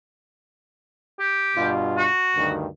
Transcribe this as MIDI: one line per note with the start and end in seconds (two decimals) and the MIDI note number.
1.19 1.69 67
1.56 2.08 43
1.56 2.08 47
1.56 2.08 65
1.97 2.51 66
2.36 2.67 38
2.36 2.67 43
2.36 2.67 51